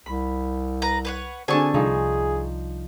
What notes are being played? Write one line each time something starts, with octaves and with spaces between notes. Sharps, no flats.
C2 B5
B4 A#5
B4 C#5 F#5
D3 C4 D4 F#4 G#4 G#5 C#6
C2 F3 D#4 G#4